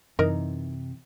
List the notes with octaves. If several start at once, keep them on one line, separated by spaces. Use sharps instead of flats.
F#2 C3 E3 D#4 A#4 D#5